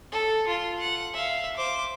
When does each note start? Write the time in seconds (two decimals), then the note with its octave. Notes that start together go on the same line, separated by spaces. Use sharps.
0.12 A4
0.48 F4 C6
0.80 F#5
1.14 E5 F5
1.57 C5 D6